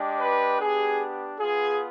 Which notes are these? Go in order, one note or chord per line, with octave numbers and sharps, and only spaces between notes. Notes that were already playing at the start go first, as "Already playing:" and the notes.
Already playing: G#3 D4 G4
B4
B3 D4 G4 G#4
B3 F4 G#4